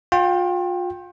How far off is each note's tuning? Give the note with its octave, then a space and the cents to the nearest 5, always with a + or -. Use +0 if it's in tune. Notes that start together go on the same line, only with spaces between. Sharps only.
F4 +35 G5 +0